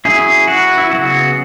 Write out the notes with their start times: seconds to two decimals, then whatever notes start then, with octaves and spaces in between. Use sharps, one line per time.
0.05 F#3 C#4 E4 G#4
0.48 F#4 B4
0.78 E4
0.91 C#3 F#3 B3 F#4